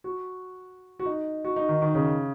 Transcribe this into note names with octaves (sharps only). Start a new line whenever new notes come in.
F#4
F#4
D#4
F#4
D#4
D#3
D#3
C#3